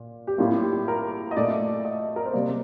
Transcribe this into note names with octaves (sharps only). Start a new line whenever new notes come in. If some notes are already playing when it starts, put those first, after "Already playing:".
Already playing: A#2
G4
A2 G3 A#3 F4
G4
A#4
D#5
A#2 A3 D5
D#5
A#4
C5
C3 G3 A#3 D5